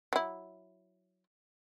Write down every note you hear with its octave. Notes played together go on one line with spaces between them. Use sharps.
F#3 E4